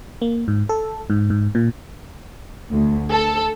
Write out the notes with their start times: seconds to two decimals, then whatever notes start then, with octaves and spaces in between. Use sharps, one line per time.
0.22 A#3
0.48 G#2
0.69 A4
1.10 G#2
1.30 G#2
1.55 A#2
2.72 D2
3.11 A4